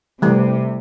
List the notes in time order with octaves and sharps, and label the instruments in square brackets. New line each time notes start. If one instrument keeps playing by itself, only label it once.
[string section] C3 [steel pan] E3 G3 A3